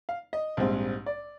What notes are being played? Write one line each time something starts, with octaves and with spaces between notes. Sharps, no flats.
F5
D#5
A#1 G#2 G3 C4
D5